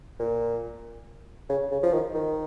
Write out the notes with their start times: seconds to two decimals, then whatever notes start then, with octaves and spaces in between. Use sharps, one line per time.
0.19 A#2
1.49 C#3
1.71 C#3
1.83 F3
1.93 D#3
2.14 D#3